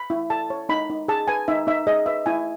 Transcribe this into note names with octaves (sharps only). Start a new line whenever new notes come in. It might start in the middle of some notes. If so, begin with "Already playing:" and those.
Already playing: B5
E4
A4 A5
C#5
D#4 B5
D#4
G#4 A5
B4 G#5
D#4 E5
D#4 E5
G#4 D#5
B4 E5
E4 G#5